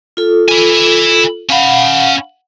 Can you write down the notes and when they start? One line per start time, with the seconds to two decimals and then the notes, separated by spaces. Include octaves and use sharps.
0.17 F4 A4
0.49 E4 G#5
1.49 C#4 F5 F#5 B5